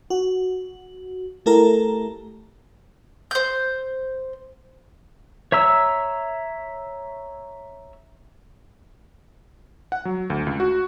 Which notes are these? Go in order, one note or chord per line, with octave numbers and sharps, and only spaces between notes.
F#4
A3 E4 G4 A4 A#4 A#5
C5 G6
C#5 E5 A#5 E6
F#5
F#3
D2
C#2
F#4